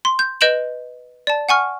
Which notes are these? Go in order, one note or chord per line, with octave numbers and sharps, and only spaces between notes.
C6
G6
B4 D#5 G6 D7 E7 F#7
D5 A5
F#5 G#5 C#6 F6